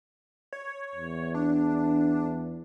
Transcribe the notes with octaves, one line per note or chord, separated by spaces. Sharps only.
C#5
E2
D4